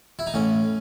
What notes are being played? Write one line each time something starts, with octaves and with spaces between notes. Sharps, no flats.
E4
D#4
A1 C#4